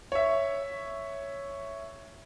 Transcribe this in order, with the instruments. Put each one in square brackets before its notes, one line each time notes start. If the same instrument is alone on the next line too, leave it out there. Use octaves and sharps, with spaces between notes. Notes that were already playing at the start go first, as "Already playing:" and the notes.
[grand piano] C#5 E5